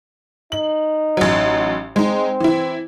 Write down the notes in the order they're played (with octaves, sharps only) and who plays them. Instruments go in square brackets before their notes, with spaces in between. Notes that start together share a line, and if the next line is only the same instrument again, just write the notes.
[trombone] D#4 [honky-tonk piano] F#7
[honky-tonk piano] A1 F#3
[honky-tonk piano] G#3 D#4 [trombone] C4
[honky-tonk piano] E3 E4